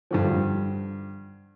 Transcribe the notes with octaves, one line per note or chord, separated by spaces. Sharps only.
G2 D3 F3